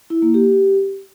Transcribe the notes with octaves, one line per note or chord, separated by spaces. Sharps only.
E4
A#3
G4